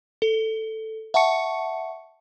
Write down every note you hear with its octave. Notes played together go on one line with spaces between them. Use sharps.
A4
E5 F#5 A5 C#6 C#7